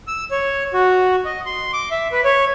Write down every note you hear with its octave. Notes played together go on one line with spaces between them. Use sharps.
E6
C#5
F#4
D#5
C6
D6
E5
B4
C#5